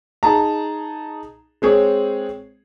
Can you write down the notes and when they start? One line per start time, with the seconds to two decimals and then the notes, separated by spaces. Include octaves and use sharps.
0.23 D#4 G#4 A5 A#5
1.62 G#3 C4 G#4 C#5